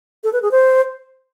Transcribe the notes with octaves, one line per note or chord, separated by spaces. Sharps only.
A4
B4
G#4
C5